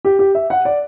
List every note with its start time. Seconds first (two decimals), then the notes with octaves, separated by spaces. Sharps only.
0.05 G4
0.19 G4
0.35 E5
0.50 F#5
0.65 D5